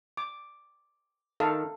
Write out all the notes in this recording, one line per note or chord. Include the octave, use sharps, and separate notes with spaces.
D6
D#3 A4 F5